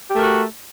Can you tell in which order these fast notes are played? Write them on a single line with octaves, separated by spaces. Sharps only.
G4 A3 A#4 F#4